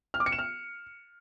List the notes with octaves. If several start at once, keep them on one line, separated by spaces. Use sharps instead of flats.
F6
D6
C#7
E7
F6